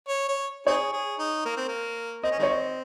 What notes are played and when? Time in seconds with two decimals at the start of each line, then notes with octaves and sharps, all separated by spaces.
0.08 C#5
0.28 C#5
0.67 C4 D#4 G#4 C#5
0.93 G#4
1.19 D#4
1.45 A#3
1.57 C4
1.68 A#3
2.23 C4 D#5
2.31 C#4
2.39 D#3 G#3 C4 C#5
2.50 D#5